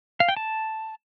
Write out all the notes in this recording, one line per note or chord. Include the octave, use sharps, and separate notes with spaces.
F5
G5
A5